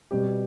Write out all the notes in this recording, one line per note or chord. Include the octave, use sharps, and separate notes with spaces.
B2 G3 C4 G4